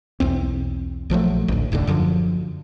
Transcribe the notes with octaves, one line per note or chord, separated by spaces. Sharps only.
B1 E2 C4
A#1 F3 F#3 A3
A1 D2
E1 D#2 A2 D3
F#2 D3 E3 F3